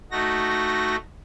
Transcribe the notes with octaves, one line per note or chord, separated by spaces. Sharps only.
A3 D#4 F#4 A#6